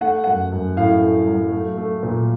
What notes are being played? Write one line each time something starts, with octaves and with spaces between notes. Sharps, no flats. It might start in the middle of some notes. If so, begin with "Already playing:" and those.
A3 F#5
F#2 F#5
F#2
A2 F5
A3
F#3
A3
A3
A#2